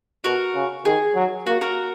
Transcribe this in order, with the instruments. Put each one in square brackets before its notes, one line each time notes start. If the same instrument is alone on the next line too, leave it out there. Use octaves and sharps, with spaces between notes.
[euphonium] B2 [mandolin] F#4 A#4
[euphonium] C#3
[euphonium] D#3 [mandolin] G#4
[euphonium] F#3
[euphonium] A#3 [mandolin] F#4
[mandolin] F#4 A#4